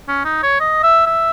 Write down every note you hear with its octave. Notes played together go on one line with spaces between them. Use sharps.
C#4
D#4
C#5
D#5
E5
E5